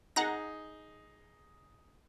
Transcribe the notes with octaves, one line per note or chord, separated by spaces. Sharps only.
D#4 G#4 F#5 A#5 A#6